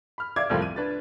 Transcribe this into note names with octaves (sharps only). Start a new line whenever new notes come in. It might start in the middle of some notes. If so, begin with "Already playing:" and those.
B5 F6
D5 E5 F5 D6 G#6
C2 F2 A2 F3 G3 A#3
D#7
D4 B4 A6